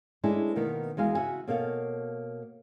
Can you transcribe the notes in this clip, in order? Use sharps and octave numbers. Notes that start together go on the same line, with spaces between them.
G#3 A3 C#4 D4 E4
B2 D#3 A#3 B3
E2 G#3 F#4 F5 G#5
C#3 F#4 E5 G#5
B2 A#3 A4 C#5 F5